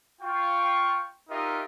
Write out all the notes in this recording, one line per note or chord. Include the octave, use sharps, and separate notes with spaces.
F4 G5 C#6
D#4 F4 G4 A#4 D#5 E5